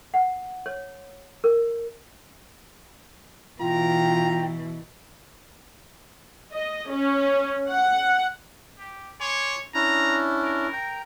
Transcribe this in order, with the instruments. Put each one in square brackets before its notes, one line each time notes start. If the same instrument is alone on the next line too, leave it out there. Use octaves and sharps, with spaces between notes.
[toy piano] F#5
C#5
A#4
[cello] B2 E3 [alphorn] F4 [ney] G5 [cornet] A#5
[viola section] D#5
C#4
F#5
[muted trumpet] G4
[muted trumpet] C#5 [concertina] G#5 C6 D6
[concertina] C#4 D4 E4 [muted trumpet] A#5
[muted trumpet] A#4
[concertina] G5 A#5